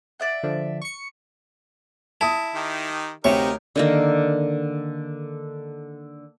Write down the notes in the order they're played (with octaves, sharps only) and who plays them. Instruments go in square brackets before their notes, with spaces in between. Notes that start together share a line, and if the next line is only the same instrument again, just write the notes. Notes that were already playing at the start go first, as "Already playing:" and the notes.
[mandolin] D5 E5 F#5
[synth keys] D3 F3 D4
C#6 C#7
[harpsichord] E4 [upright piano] A5 D#6
[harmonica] D#3 D#4 G4
[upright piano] D2 [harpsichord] C3 C#6 [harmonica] D#4 G4 A#4 [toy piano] C#5
[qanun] D3 D#3 A#3